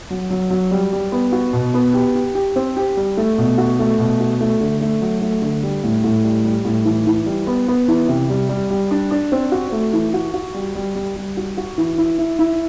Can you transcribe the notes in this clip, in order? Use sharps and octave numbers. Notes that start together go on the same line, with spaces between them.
F#3
F#3
F#3
G3
G3
B3
F#4
B2
B3
G4
G4
G4
C4
G4
G3
A3
B2
F#4
A3
B2
F#4
A3
D3
A3
F#3
A3
D3
G3
A2
A2
G3
G3
A2
E3
E3
G3
B3
B3
E3
C3
G3
G3
G3
D4
D4
C4
F#4
A3
E3
F#4
F#4
G3
G3
G3
G3
F#4
F#4
E3
E4
E4
E4